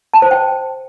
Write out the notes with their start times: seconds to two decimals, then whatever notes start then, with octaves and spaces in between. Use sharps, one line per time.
0.14 A5
0.22 C5
0.31 G5